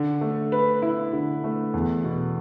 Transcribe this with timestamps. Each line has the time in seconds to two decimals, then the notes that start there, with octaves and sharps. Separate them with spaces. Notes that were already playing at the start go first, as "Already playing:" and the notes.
Already playing: D3
0.21 A3
0.52 B4
0.82 E4
1.13 D3
1.44 A3
1.74 E2
2.04 B2